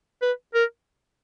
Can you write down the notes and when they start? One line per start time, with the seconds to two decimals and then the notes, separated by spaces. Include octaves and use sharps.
0.22 B4
0.54 A#4